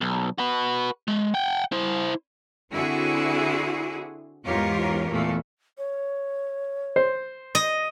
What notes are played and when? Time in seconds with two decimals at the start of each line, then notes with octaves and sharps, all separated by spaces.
0.01 B1
0.38 F#4 B4
1.08 G#3
1.34 F#5 G5
1.72 E4 C5
2.73 D3 C4 E4 F#4 G#4
4.45 E2 G#2 F4 G4 A#4 C#5
5.11 E2 A#2 A3
5.78 C#5
6.96 C5
7.55 D#5